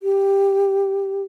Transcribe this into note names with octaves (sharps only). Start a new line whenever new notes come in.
G4